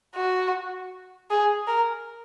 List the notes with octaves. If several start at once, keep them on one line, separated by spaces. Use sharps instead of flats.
F#4
G#4
A#4